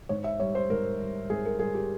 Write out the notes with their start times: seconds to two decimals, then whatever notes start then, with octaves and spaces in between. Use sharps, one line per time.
0.09 G#2 C#5
0.24 E5
0.40 G3 C#5
0.55 C5
0.70 G#2 A#4
0.99 G3
1.30 G#2 G#4
1.45 A#4
1.59 G3 G#4
1.75 G4